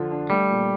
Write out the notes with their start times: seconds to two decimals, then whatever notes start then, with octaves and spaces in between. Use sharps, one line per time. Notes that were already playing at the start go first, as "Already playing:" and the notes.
Already playing: D3 F3 F4
0.11 D4
0.30 G3 A3
0.50 A#2